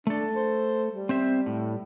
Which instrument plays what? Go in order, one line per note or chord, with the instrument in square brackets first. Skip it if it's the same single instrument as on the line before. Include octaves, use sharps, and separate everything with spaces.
[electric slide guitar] A3 A4 [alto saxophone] D4
[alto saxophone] C5
G3
[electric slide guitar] C4 C5 E5
A2